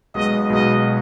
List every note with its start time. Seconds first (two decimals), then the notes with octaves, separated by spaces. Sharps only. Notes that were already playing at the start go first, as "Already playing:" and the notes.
0.14 B1 B2 G#3 B3 D#5
0.50 B1 B2 G#3 B3 D#5